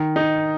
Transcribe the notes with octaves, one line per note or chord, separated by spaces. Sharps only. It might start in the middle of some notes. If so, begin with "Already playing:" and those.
Already playing: D#3
D#4